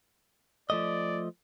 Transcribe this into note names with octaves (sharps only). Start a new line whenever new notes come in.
F3 A3 D5 D#5